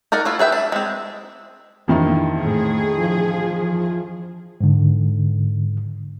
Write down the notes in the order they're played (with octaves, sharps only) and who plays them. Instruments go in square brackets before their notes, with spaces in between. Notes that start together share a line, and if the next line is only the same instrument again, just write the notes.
[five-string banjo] D#4 A#4 D5 F#5
A3 E4 F4
G#4 B4 E5 G5
D4
G#3 C4
[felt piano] F2 D#3 E4 [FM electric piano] E3 D4 [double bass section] A#3
[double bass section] A2 [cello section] G#4
[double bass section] F3
[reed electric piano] G#2 D3